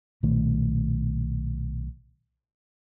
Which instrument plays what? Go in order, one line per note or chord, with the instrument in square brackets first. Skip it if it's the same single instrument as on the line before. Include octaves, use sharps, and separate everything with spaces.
[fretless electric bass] B1 A#2 D#3 A3